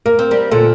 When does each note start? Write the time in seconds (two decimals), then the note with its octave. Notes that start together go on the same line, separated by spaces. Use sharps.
0.06 A#3 A#4
0.19 C4
0.31 G3 A#3
0.51 A#2 D3 A4